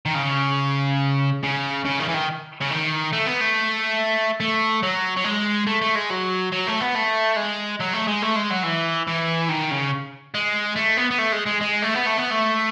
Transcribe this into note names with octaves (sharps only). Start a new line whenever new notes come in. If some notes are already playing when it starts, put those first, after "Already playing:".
D#3
C#3
C#3
C#3
D#3
E3
D#3
C#3
D#3
A3
B3
A3
A3
F#3
F#3
G#3
A3
A3
G#3
F#3
F#3
A3
B3
A3
G#3
F#3
A3
G#3
A3
G#3
F#3
E3
E3
D#3
C#3
G#3
A3
B3
B3
A3
G#3
G#3
G#3
A3
B3
A3
B3
A3